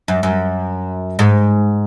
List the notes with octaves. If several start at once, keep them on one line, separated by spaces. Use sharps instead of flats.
F#2
F#2
G#2